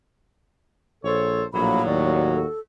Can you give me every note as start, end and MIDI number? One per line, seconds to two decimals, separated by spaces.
1.04 1.44 34
1.04 1.43 46
1.04 1.44 69
1.04 1.43 72
1.04 1.43 73
1.53 1.81 34
1.53 2.38 45
1.53 2.38 54
1.53 1.83 58
1.53 1.86 83
1.86 2.45 39
1.86 2.47 66
1.86 2.32 74
2.32 2.60 69